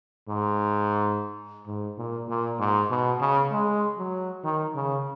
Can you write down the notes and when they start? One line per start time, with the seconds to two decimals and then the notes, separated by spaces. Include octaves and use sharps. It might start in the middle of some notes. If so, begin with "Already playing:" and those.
0.28 G#2
1.67 G#2
1.98 A#2
2.28 A#2
2.59 G#2
2.90 B2
3.21 C#3
3.51 G#3
3.98 F#3
4.44 D#3
4.75 C#3